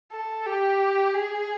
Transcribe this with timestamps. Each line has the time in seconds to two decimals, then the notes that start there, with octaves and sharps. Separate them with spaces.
0.12 A4
0.46 G4
1.14 G#4